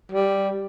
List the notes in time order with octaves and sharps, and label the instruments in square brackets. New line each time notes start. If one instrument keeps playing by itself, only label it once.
[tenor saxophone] G3